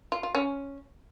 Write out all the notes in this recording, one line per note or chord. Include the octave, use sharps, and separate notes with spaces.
F4
F4
C#4